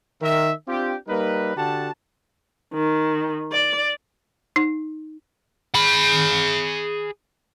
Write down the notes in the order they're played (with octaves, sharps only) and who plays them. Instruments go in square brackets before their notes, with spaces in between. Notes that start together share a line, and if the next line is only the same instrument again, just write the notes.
[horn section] D#3 A#4 E5
C4 D4 F4 G4
G3 A#3 D#4 A#4 B4
D3 F#4 G4 F#5 A5
[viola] D#3
D5
[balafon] D#4
[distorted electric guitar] G#4 B5